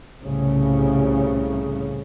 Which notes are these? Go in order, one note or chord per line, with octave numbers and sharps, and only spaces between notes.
C2 A2 C#3